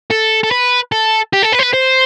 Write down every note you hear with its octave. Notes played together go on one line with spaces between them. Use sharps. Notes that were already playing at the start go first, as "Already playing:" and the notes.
A4
A4
B4
A4
G4
A4
B4
C5
B4
C5